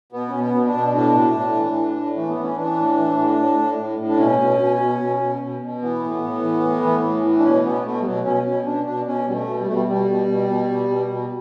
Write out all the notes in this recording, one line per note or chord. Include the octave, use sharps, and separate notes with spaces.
B2 B3
B2 C#4
B3
B2
D4
B2
A2 D4
A2
A2
E3
A2
A2
E3 A3
B3
E3
C#4
E3 D4
A2
E3
A2
A2
A2
A2
A2
D4
B2 C#4
B2
B2
B2
B2
B2
B2
B2
E3 B3
A2
A2
E3
A2
E3
A2
E3
D4
B2 C#4
B2 B3
B2 A3
G3
B2 F#3
B2 C#4
B2 C#4
B2 D4
B2 D4
B2 C#4
B2 G3
A3
B2
G3
B2 A3
G3
B2 G3
B2
B2
B2
B2
B2
B2